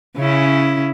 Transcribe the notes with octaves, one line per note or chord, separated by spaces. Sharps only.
C#3 C#4 E4